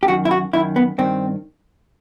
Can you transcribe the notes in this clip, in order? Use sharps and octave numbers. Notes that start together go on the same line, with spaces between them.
G4
F#2 D#3 F#4
E4
F#4
F#2 D#3 E4
B3
G2 D#3 C4